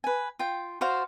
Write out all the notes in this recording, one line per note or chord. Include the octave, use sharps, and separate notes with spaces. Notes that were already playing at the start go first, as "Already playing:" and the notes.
B4 G#5
F4 G5
F#4 C5 D5 F5